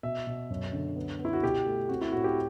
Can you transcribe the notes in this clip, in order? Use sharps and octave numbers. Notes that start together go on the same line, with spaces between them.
B2 E5
B2
F#2
D3
B3
B3
E4
F#4
B2 G4
A3
C4 F#4
E4
A2 F#4
G4